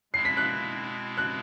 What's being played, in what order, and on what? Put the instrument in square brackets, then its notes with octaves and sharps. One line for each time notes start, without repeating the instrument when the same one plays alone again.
[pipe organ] B2 G#3 C4 E4 [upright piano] C7
[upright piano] B6
F#6
F#6